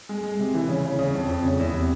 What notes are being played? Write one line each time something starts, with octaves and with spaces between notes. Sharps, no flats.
G#3
G#3
C3
E3
C#3
C#3
C#3
F2
F2
C#3
E2
C3